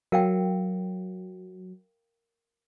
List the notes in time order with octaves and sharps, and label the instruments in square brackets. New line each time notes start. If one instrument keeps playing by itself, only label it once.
[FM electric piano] F#3 [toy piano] A#4 F5 G5